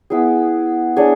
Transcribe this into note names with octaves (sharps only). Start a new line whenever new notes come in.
B3 E4 G#4
D4 G#4 C#5